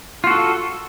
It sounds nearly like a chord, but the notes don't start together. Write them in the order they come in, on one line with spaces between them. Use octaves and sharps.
F4 F#4 A4